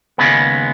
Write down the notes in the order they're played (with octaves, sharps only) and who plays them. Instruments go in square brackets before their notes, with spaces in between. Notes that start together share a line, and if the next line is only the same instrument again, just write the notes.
[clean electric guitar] D#2 C#3 G#3 B3